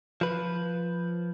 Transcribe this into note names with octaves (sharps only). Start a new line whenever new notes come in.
F3 B4